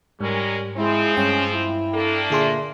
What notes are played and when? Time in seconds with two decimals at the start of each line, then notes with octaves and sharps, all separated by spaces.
0.21 G#2 G3 G#3 C#4 A#4
0.77 F3 G#3 C4 E4
1.17 G2 C#4 G5
1.53 E4
1.94 A3 A#3 D4 A4
2.30 A#2 D3 G#4 E5 C6